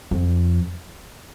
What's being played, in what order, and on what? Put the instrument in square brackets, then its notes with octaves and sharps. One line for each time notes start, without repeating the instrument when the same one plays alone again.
[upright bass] F2